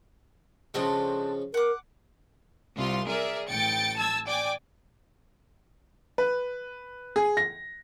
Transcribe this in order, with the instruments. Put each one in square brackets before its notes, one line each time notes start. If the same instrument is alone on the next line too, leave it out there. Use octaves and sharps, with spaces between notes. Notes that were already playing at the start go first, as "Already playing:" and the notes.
[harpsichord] C#3 F3 G#3 [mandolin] A3 C4 D4
[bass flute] A#4 [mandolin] F#5 D6
[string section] C2 F4 C6
G#4 A#4 D5 E5
A1 G5 A6 C#7
A5 E6 G#6
D5 G5 G#5 D6
[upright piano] B4
G#4
A#6